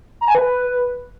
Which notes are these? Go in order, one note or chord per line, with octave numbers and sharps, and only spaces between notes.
A#5
G#5
B4